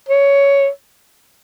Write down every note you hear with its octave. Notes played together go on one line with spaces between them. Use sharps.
C#5